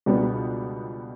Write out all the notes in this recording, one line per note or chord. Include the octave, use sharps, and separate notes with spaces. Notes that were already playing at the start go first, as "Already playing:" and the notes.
C#2 B2 G3 B3 D4